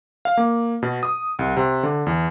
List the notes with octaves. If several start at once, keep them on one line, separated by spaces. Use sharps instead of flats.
F5
A#3
B2
D#6
C2
C3
D3
E2